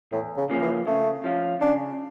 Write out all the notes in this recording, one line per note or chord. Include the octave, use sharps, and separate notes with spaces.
E2 A2
C#3
C#3 F3 A#3 C#4
E3
C#3 A3
F3 C#4 F4
C#3 D4